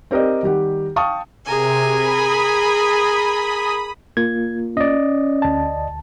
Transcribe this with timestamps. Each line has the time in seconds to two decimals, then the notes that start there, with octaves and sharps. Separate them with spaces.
0.11 C4 G4 A#4 D5 D#5
0.43 D#3 G3 G4 F#5
0.96 F5 G5 A5 C#6 D#6
1.46 C3 G#4 A#4 G#5
1.96 B5 D#6
4.17 A#3 F4 G#6
4.77 C#4 D5 D#5
5.42 D2 A5